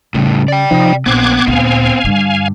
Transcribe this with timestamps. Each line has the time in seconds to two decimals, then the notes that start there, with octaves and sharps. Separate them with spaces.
0.14 A2 C#3 G3
0.48 D5 G5
0.71 C3 F3 D#4
1.06 A#1 B3 C4 C5 D6 F#6 G#6
1.48 D2 A#2 F5 G#5
2.04 G2 D3